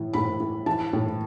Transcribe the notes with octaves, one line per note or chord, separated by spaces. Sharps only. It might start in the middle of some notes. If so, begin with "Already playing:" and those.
Already playing: A2 E3
A2 B5
E3
E3 A5
A2